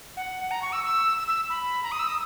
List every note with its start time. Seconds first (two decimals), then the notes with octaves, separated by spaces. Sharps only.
0.17 F#5
0.51 A#5
0.62 C#6
0.72 E6
0.84 E6
1.17 E6
1.28 E6
1.50 B5
1.83 A#5
1.92 D#6
1.99 E6
2.08 D#6